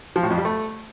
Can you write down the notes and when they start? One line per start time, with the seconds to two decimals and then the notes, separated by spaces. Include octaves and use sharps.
0.16 F3
0.23 A2
0.30 F2
0.38 G3
0.45 A3